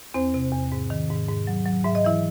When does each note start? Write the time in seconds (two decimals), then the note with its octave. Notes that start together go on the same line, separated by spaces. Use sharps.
0.14 E2 C4 C5
0.34 C3
0.52 E2
0.72 G#2
0.90 D#3
1.10 G#2
1.29 G#2
1.47 F#3
1.66 F#3
1.84 G#2 E5
1.95 D#5
2.05 E3 E4 E5